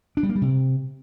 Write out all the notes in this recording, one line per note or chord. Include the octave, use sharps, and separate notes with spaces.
D4
G3
A#3
G3
C3